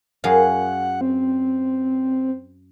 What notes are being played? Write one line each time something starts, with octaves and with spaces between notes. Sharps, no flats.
F#2 G#4 F5 F#5
C4